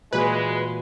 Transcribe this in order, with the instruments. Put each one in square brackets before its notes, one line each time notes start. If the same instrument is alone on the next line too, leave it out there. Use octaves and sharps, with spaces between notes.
[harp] A#2 E3 F#4 [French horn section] G#3 [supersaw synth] B4